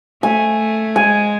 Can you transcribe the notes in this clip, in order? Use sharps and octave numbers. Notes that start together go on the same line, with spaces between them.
A3 G#5
G#3 G#5